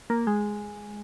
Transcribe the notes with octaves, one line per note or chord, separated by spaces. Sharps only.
A#3
G#3